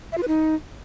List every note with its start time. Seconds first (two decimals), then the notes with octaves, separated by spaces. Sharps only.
0.12 E5
0.17 F4
0.23 B4
0.28 D#4